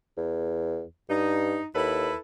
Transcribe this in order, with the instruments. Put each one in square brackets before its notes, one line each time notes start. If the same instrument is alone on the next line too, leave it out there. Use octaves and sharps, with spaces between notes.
[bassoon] E2
[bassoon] G2 [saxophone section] D#4
[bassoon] D#2 [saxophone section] E4 A4 B4